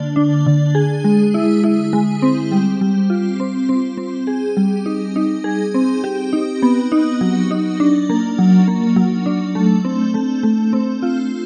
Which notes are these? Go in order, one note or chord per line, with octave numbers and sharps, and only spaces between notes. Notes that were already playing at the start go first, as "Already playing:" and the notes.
Already playing: D3 A#3 D4
D4
D3
G#4
G#3
E4
E4
G#3
C4
G3
G3
F4
C4
C4
C4
G#4
G3
D#4
D#4
G#4
C4
G4
D#4
B3
D#4
F#3
D#4
D4
A#3
F#3
A#3
F#3
D4
A3
C4
A3
A3
C4
F4